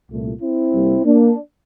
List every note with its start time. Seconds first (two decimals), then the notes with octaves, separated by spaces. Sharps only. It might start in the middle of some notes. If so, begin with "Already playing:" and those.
0.10 C2 A#2 A3
0.41 C4 E4
0.73 C2 C3 G3 A#3
1.05 A#3 D4